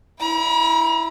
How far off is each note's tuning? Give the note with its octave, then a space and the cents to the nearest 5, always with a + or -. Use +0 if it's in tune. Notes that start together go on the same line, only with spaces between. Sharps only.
E4 +0 A#5 +40